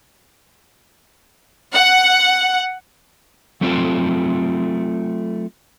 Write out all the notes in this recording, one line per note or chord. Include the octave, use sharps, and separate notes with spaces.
F#5
F#3 A3 C4 F4 A4